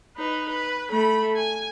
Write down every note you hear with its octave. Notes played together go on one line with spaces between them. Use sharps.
D#4 B4
B4
A3 B5
G#5